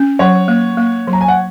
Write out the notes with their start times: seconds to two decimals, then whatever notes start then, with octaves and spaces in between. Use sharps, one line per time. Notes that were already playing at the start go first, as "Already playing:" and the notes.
Already playing: C#4
0.19 F#3 C#5 F#5
0.48 A#3
0.77 A#3
1.07 F#3
1.13 A#5
1.21 G#5
1.28 F#5